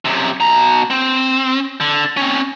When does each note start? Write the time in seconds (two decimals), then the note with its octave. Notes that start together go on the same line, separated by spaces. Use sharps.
0.05 F#2 C3
0.40 B2 A#5
0.90 C4
1.80 D3
2.17 C4 C#4